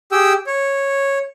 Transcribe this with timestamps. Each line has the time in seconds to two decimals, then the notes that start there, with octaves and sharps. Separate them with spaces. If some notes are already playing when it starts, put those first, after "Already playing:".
0.12 G4 G#4 G5 E6
0.47 C#5